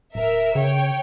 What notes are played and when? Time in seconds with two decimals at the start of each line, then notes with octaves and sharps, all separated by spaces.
0.15 D1 A#4 E5
0.55 C#3 C#5 G5